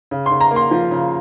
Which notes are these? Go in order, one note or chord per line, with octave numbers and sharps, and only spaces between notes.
C#3
C6
C#3
A#5
A#3
C6
F3
C#3